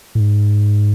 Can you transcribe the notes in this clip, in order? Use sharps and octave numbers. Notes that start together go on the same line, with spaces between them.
A2
G#2